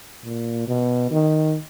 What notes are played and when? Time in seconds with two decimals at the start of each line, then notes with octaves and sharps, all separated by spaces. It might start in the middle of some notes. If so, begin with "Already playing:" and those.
0.25 A#2
0.68 B2
1.11 D#3